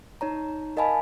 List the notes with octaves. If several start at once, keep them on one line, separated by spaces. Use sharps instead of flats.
D#4 C#5 A#5
A#4 D#5 F5 G#5 A5 B5